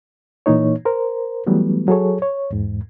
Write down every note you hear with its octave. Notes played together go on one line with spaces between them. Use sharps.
A#2 E3 A#3 D#4 C#5
A#4 C5
E3 F#3 G3 A3 B3
F#3 G#4 A4 C#5
C#5
E2 G#2